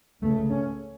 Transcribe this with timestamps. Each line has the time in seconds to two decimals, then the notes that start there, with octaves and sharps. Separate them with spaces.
0.22 C#2 C#3 A3
0.50 C#4